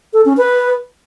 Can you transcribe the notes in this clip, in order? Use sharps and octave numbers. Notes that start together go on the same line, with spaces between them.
A4
C#4
B4